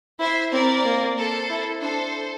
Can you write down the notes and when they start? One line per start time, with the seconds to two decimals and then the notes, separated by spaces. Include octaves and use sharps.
0.19 E4 C5 E5
0.52 C4 A#4 D5
0.85 A#3
1.17 A4 C5
1.50 E4
1.82 D4 A4 C5